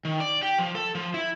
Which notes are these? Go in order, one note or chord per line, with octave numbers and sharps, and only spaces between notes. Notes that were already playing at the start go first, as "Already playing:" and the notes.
D#3
D5
G4
F3
A4
F3
E4